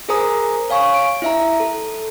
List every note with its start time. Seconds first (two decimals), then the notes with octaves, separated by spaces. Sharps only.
0.09 G#4 A#4 C5 G#5 A#5 D#6
0.70 C#5 F5 G#5 C#6
0.94 D7
1.22 E4 E5 A#5
1.60 A4